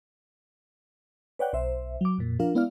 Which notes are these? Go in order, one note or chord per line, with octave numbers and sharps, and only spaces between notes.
B4 C#5 D5 F#5 G5 F#6
B1 C5 E5
F#3 D6
F2 A#2
F3 D4 F4 A#4 F5
G#3 B3 E4 D5 F5 F6